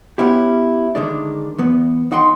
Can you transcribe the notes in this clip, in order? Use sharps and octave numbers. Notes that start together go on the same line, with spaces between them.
B3 C#4 E4 G4
D3 D#3 G#3 D4
E2 B3
D#2 D#4 F#5 G5 C6